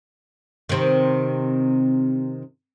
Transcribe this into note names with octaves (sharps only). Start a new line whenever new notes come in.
C3 D#3